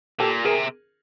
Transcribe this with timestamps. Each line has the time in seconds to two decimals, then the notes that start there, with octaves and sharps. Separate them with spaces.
0.20 A#2 G4 A4
0.45 C3 G#4 A#4